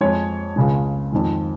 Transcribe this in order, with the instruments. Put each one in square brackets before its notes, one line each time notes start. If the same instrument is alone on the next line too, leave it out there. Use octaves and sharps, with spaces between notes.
[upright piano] F2 F3 G#3 C#5
C#2 C#3 G#3
F2 D#3 G#3